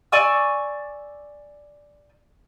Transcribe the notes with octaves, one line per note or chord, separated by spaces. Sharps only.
D5 G#5 C#6 E6